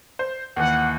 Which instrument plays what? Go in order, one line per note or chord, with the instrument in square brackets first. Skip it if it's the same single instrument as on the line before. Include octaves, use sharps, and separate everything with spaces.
[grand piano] C5
[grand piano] D#2 E3 [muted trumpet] F#5